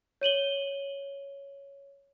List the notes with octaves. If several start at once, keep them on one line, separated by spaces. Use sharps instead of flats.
C#5 D#7 F#7 G7